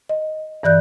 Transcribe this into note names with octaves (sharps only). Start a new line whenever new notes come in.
D#5
G2 E3 D5 F#6 G6